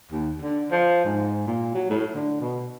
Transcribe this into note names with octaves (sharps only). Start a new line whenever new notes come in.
D#2
D3
F3
G#2
A#2
F#3
A2
D3
B2